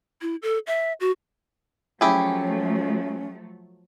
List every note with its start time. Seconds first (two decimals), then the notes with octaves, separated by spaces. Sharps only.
0.22 E4
0.42 A4
0.67 E5
1.00 F#4
2.01 F3 F#3 A3 C#4 E4 G4 G#4